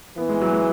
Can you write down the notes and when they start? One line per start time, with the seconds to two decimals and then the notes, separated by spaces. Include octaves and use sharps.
0.17 E3 B3
0.29 G#3
0.41 F#3
0.53 G#3